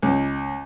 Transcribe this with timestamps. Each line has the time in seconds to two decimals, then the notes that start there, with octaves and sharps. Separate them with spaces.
0.02 C#2